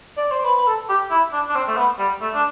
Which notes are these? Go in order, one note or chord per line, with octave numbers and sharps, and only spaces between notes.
D5
C5
B4
B4
A4
G4
E4
D4
D4
C4
A3
B3
G3
A3
D4